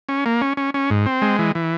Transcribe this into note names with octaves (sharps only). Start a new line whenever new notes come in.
C#4
A#3
C#4
C#4
C#4
G#2
C4
G#3
E3
E3